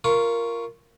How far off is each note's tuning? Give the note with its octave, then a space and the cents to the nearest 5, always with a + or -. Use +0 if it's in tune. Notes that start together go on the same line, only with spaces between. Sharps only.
F4 -15 A#4 +0 C#6 +0